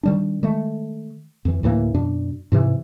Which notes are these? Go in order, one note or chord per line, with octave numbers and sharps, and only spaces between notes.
D#3 G3 D4
D#3 G#3 A3
F2 E3
D2 A2 E3 A#3
F#2 B2 D4
G#2 C3 E3